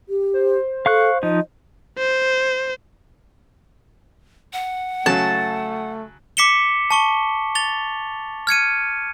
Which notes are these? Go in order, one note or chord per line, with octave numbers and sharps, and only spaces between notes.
G4
C5
A4 F5 C#6 F#6
F3 D#4 D#5
C5
F#5
C#3 F#3 A3 A5
D6 B6 C#7 E7 G7
A5 C#6 G7
A6 F7 G7
F6 G#6 C#7 D#7